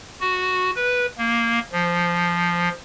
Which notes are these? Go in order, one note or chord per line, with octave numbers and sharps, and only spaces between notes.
F#4
B4
A#3
F3